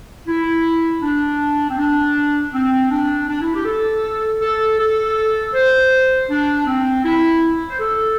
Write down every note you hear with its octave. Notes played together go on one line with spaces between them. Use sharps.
E4
D4
C4
D4
C4
D4
D4
E4
G4
A4
A4
A4
C5
D4
C4
E4
C5
A4